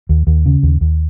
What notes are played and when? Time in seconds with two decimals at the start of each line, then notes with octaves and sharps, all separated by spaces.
0.09 D#2
0.27 D#2
0.46 C#3
0.63 D#2
0.81 D#2